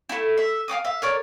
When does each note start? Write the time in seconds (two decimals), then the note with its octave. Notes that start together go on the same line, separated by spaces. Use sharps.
0.09 A3 E4
0.38 E5
0.68 F5 G5 D6 D#6
0.85 E5 F5
1.02 A#4 C#5 D5